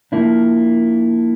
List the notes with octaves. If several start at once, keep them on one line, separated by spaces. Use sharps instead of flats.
F3 A#3 D4 E4